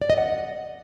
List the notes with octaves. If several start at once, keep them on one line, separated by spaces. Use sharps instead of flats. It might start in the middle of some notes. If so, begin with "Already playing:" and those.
D5
D#5
F#5